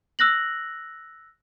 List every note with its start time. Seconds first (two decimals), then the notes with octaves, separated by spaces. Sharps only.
0.19 E6 F#6 A#6 F#7